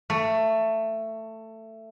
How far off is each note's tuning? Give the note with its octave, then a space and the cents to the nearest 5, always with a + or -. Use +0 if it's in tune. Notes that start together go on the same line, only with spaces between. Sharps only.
A3 +15